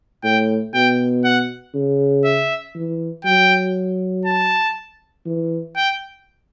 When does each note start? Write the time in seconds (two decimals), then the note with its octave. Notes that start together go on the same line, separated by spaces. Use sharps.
0.23 A2 G5
0.74 B2 G5
1.24 F#5
1.75 C#3
2.25 E5
2.75 E3
3.25 F#3 G5
4.25 A5
5.26 E3
5.76 G5